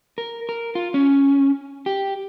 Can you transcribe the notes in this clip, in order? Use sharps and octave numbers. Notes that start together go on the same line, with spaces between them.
A#4
A#4
F4
C#4
G4